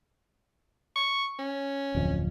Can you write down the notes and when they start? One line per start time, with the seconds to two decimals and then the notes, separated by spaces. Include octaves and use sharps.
0.96 C#6
1.39 C#4
1.95 D1 F2